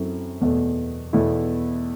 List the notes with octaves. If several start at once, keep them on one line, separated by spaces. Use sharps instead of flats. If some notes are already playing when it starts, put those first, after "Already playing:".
Already playing: F#2 F#3 C4 E4 A4
E2 B2 A3
E2 B2 A3 E4